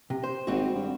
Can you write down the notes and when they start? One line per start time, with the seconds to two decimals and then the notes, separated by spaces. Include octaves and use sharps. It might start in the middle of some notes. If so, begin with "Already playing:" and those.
0.10 C3
0.24 C5
0.47 G#1 G3 C4 F#4
0.75 G2